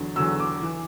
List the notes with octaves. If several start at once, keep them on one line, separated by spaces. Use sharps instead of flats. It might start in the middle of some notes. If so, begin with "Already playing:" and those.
Already playing: E2 D3 F#3
E2 D3 F#3 E6
D6
E3